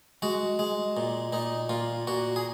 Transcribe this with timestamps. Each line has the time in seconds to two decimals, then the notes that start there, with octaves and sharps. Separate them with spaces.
0.22 G#3 F#4
0.59 G#3
0.97 A#2
1.32 A#2 D#4
1.69 A#2 F4
2.07 A#2 F#4
2.36 G#4